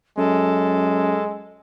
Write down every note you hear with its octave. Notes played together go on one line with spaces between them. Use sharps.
F#2 G#3 A4